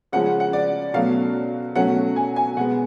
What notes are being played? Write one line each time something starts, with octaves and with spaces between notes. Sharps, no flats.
C#3 F3 G#3 C#4 F#5
F#5
F#5
D5
B2 F#3 A3 C#4 F5
B2 F#3 A3 C#4 F#5
G#5
G#5
B2 G#3 B3 F#5